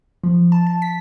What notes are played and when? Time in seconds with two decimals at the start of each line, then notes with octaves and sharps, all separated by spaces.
0.24 F3
0.52 A5
0.67 A5
0.82 B6